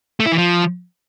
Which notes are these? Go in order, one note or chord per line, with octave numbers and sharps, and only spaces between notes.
A3
E4
E3
F3